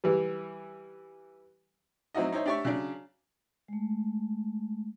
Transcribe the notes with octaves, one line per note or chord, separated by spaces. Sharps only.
E3 G3
F#3 C4 D#4 E4 F#4 D#5
D#4 E4 C5 C#5
D4 G4 D5 E5 C#6
C#3 F#3 D4
G#3 A3